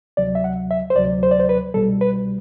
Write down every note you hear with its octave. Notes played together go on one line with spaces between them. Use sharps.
D2 C3 F#3 D5
E5
F#5
E5
C5
D2 C3 F#3 D5
C5
D5
C5
B4
C2 B2 G3 A4
B4